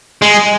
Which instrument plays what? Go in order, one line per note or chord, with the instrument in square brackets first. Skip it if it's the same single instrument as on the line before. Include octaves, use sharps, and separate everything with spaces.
[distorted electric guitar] G#3